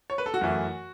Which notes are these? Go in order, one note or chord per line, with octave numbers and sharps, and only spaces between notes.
C#5
B4
A4
F#4
F#2 E3 A3